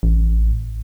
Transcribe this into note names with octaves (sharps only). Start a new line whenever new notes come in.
A1